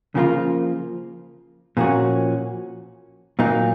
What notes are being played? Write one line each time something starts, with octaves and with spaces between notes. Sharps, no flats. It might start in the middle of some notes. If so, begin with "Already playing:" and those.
C#3 F3 A#3 F4
A#2 F3 A#3 C#4 F#4
A#2 F#3 A#3 D#4